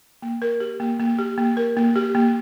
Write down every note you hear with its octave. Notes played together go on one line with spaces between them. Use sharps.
A#3
A#4
G4
A#3
A#3
G4
A#3
A#4
A#3
G4
A#3